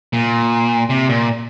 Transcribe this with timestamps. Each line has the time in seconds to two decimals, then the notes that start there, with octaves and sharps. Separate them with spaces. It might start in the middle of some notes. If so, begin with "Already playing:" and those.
0.13 A#2
0.90 C3
1.09 A#2